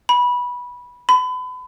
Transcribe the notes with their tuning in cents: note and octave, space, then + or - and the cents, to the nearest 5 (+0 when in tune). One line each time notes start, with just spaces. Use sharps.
B5 -15
B5 +35